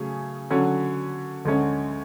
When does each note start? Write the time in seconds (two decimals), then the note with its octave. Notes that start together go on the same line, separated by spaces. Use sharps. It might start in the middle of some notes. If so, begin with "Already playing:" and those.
Already playing: C#3 F#3 A3 C#4 G#4
0.50 D3 F#3 C#4
1.45 D2 D3 G#3 C#4